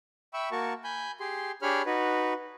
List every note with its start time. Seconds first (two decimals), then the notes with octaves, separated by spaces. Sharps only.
0.34 E5 G5 B5 C#6 E6
0.52 A#3 F#4 A#4 A5 C#6
0.84 G#5 B5 G6
1.20 G4 G#4 C6
1.62 D4 G4 G#4 C#5 B5 F6
1.86 D#4 F#4 B4